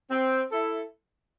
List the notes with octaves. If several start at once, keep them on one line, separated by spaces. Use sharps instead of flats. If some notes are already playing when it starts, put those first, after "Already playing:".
C4
E4 A4